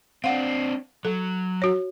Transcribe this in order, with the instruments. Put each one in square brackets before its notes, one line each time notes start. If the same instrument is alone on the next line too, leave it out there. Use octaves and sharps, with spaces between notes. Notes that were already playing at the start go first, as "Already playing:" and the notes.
[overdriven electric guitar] C4 D4 [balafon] F5 F#5
[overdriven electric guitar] F#3 [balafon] A4
[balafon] F#4 C#5